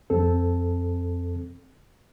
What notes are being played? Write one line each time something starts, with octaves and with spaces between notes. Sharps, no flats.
F2 C4 A4